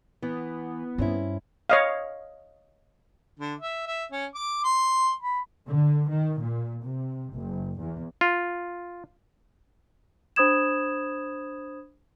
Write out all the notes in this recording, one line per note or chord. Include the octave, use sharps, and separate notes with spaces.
E3 B3
G2 C4 C#4 E4
C#5 D#5 F5
D3
E5
E5
C#4
D6
C6
B5
D3
D#3
A#2
C3
F#1
E2
F4
D4 C5 B5 D#6 G#6 E7